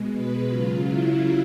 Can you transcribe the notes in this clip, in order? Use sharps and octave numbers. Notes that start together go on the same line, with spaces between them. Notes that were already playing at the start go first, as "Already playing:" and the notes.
Already playing: B2 G#3
B4
C#3 F#3 F4
E4